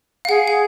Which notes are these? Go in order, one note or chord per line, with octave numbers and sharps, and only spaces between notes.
F5
G#4 F#5
F#5